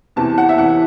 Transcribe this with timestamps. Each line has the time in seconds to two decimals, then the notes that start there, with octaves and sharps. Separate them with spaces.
0.16 E2 C3 E3 A5
0.38 F#5
0.49 E5
0.57 E2 C3 E3 F#5